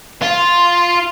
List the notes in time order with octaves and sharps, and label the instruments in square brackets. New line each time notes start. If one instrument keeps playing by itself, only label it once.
[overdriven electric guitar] F4